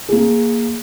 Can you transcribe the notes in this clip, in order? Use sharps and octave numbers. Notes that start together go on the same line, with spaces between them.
A#3 G#4